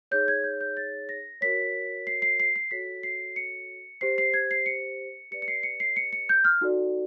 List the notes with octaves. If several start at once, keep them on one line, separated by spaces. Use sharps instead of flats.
D#4 G#4 C#5 G6
G#6
G6
G6
A6
A#6
F#4 A#4 C#5 B6
C7
C7
C7
C7
F#4 A4 C#5 B6
C7
C#7
G4 C5 C7
C7
G#6
C7
C#7
G4 B4 D5 C#7
C#7
C7
C#7
C7
C#7
C#7
G6
F6
D#4 F#4 A4 D5